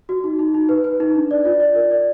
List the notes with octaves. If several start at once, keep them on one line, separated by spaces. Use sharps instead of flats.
F#4
D#4
D#4
D#4
B4
B4
D#4
D4
D5
F4
D5
A#4
D5